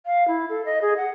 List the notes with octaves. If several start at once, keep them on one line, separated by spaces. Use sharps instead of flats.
F5
E4
A4
D#5
G#4
F#5